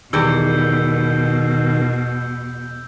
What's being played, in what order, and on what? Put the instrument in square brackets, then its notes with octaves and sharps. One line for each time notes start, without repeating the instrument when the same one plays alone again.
[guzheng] E2 G3 C#5 [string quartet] B2 [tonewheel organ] D#3 [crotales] E6 G6